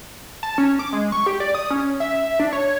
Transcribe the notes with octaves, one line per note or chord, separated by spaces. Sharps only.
A5
C#4
D6
G#3
C#6
G4
D5
D#6
C#4
E5
D4
C#5